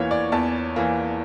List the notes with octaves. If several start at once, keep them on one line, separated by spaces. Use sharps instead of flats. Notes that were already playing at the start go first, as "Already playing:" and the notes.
Already playing: E2 E3 A#3 C#5
D5
E2 A5
E3 A#3